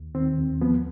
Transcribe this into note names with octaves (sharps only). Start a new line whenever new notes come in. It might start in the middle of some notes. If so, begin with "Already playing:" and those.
Already playing: D#2
D#3 C4
D#2
F3 B3